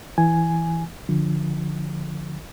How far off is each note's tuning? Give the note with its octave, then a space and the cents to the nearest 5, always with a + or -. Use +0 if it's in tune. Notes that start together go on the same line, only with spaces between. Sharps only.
E3 +0 G#5 +0
D3 +0 F3 +5